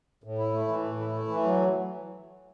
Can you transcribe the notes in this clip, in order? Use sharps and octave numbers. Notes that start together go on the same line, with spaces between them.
A2
E4
A3
E3
A2
E4
A3
E3
F#3